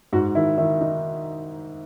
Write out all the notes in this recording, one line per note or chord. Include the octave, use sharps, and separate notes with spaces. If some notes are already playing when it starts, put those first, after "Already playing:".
G#2 F#4
D#3 E4
D#3 E4
D#4